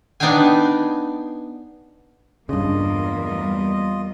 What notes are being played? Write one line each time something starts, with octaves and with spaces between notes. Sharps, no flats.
B3 D4 D#4 F5 G5 G#5
E2 G2 C#3 G3 A#3 F4 D#5